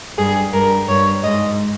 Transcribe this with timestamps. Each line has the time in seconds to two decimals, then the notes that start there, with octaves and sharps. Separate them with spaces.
0.18 G2 G#4
0.53 G2 A#4
0.88 G2 C#5
1.23 G#2 D#5